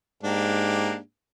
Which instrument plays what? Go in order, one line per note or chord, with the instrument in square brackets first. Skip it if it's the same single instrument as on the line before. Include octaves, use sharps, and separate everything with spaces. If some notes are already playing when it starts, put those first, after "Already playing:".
[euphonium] G#2 [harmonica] A#3 D4 G4